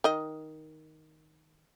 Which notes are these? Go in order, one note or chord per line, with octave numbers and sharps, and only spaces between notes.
D#3 D#5